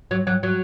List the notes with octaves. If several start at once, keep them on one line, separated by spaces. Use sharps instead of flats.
F#3
F#3
F#3